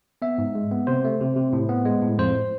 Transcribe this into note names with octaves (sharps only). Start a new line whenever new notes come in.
B3 E5
G#2
G#3
B3
C3 C5
A3
C3
C3
A2
B3
G#3
A2
F2 C5